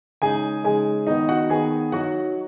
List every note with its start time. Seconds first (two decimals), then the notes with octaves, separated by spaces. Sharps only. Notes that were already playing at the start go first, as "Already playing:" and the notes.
0.22 C#3 G#3 D#4 G#4 G#5
0.64 C#3 G#3 D#4 G#4 G#5
1.07 D#3 B3 D#4 D#5
1.29 F#4 F#5
1.50 D#3 B3 D#4 G#4 G#5
1.92 F#3 D#4 F#4 F#5